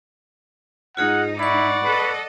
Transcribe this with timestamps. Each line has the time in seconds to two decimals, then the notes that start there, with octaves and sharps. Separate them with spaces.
0.97 G#2 D#4 F4 G#4 F#5 D#6
1.39 E4 D5 F#5 B5 C#6
1.85 A4 B4 D#5